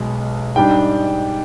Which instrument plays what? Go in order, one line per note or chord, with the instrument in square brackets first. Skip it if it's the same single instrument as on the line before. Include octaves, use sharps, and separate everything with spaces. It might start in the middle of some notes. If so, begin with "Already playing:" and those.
Already playing: [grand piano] B1 B2 G#3
G#2 G3 D4 G5